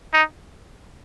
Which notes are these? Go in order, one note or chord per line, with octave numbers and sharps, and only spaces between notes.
D#4